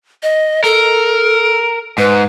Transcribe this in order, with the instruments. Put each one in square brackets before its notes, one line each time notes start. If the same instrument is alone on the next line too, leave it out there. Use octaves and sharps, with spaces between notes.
[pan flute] D#5
[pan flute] A4 [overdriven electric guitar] A#4
[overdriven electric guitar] G#2 [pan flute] B4